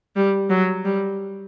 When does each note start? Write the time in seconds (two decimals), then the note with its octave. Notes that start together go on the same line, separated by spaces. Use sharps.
0.16 G3
0.50 F#3
0.85 G3